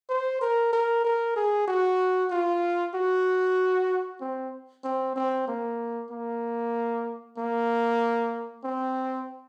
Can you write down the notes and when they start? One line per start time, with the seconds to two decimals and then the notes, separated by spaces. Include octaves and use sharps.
0.09 C5
0.41 A#4
0.73 A#4
1.04 A#4
1.36 G#4
1.67 F#4
2.30 F4
2.94 F#4
4.21 C4
4.84 C4
5.16 C4
5.48 A#3
6.11 A#3
7.38 A#3
8.64 C4